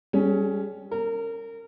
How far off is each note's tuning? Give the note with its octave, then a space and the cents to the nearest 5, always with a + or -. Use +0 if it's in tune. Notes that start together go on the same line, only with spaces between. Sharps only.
G3 +5 C#4 +5 G#4 +35
A#4 -30 A#5 +0